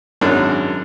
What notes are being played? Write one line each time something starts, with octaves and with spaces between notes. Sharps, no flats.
G#1 F#2 C#4 D4 A#4